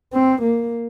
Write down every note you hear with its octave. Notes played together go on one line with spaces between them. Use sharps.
C4
A#3